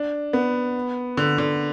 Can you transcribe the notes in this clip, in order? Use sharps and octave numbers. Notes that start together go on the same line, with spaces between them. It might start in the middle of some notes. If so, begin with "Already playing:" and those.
Already playing: D4
B3
D3
D3